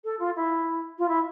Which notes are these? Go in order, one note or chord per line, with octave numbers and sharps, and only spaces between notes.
A4
F4
E4
F4
E4